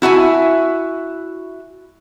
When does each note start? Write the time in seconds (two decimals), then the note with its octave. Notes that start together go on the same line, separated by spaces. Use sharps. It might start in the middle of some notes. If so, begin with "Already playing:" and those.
0.02 E4 F#4 E5 G#5